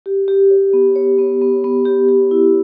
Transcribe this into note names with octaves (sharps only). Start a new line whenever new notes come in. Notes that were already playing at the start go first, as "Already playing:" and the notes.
G4
G4
C#5
B3
C#5
B3
B3
B3
G4
G4
E4